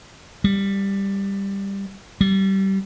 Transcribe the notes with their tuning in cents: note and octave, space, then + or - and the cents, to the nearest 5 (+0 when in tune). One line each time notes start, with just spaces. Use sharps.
G3 +10
G3 -25